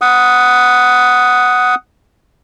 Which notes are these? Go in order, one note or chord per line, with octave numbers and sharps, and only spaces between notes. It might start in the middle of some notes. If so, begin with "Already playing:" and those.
F#5 D#6